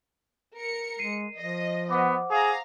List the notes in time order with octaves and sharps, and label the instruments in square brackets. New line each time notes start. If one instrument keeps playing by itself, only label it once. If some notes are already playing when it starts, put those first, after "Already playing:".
[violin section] A#4 C#7
[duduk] G#3 [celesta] C7 D#7
[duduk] F3 [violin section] D#5
[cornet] B3 [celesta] C5 F#5 D6
[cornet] G#4 [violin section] F5 A#5